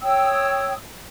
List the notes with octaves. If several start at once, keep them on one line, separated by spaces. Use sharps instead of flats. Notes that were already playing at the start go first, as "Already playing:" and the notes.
C#5 G5 D#6 E6